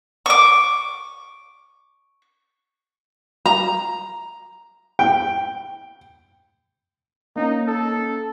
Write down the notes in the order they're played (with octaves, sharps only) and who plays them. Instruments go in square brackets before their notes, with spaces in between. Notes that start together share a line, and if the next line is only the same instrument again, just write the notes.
[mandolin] C#6 D6
[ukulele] A#5
[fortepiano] G5
[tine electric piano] A#3 C#4 [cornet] D#4
[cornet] A4